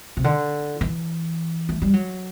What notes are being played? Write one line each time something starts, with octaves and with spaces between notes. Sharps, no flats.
C3
D3
E3
A3
G3
F#3